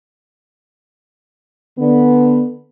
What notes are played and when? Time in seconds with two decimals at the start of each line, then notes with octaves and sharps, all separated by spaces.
1.78 D3 B3